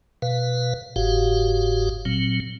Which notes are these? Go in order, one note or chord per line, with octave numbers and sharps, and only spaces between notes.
B2 B4 F5
F#1 G#2 F#4 G4 F5
A#2 F#3 C4